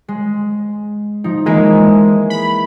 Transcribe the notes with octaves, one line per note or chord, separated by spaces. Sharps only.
G#3
F3 D#4
E3 G#3 A#3 E4
B5